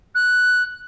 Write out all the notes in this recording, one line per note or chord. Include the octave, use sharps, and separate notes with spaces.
F#6